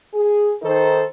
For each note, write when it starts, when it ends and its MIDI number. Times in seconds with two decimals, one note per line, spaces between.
0.14 0.52 68
0.62 1.04 51
0.62 1.04 63
0.62 1.04 69
0.62 1.04 72